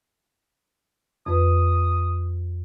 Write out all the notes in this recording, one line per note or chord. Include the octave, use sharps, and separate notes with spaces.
F2 B4 D#6